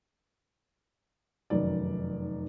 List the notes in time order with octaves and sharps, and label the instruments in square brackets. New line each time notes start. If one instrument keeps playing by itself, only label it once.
[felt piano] F1 F#2 D#3 D5